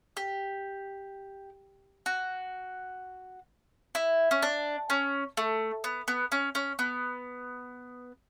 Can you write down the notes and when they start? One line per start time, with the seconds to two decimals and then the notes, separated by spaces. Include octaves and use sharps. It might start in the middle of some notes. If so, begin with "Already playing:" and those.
0.17 G4
2.06 F#4
3.95 E4
4.31 C#4
4.42 D4
4.90 C#4
5.37 A3
5.84 B3
6.08 B3
6.32 C#4
6.55 C#4
6.79 B3